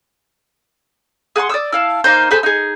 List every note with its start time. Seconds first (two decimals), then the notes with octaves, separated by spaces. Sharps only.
1.36 G#4 F#5 B5 C6
1.49 D5 D#6 E6
1.72 E4 F5 A5
2.04 A#3 C4 D#4 C5
2.31 G#4 A4 C5 B5
2.43 D#4 G#4